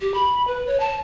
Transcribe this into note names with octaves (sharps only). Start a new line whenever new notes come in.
G4
B5
B4
C#5
A5